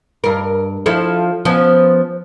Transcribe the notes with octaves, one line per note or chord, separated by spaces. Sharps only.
G2 A#4
F3 E4 A4
F3 B3 C#4